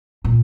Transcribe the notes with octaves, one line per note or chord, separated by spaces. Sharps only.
A#2